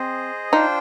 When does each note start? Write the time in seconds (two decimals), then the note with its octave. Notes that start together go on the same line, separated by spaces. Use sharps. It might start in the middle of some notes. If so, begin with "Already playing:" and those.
Already playing: C4 G#4 C5 D#5
0.53 D4 D#4 F4 C5 G5